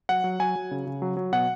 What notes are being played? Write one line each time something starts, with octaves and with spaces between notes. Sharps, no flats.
F#3 F#5
F#3
F#3 G#5
F#3
C#3
C#3
F#3
F#3
B2 F#5